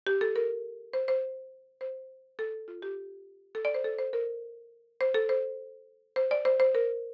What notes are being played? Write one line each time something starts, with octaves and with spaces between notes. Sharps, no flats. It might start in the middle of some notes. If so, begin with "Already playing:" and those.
G4
A4
A#4
C5
C5
C5
A4
F4
G4
A4
D5
C5
A4
C5
A#4
C5
A4
C5
C5
D5
C5
C5
A#4